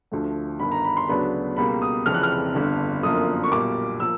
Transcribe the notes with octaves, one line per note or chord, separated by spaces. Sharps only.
D2 D3 F3 A3
G1 G2 D#3 B5
A#5
B5
C6
D2 C#3 F#3 B3 D4 B5
C#2 B2 G3 A#3 B5
D#6
F1 F2 C#3 E3 F6
F#6
F6
G1 G2 D3
G1 F#2 D3 F3 A#3 D#6
C#6
B1 A#2 G3 D6
F3 A#3 E6